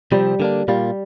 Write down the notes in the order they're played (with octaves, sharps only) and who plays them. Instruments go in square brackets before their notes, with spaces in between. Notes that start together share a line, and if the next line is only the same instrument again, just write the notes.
[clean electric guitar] C3 F3 C4 [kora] G3
[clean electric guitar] D3 A#3 D4
[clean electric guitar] A#2 A#3 F4 [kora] G3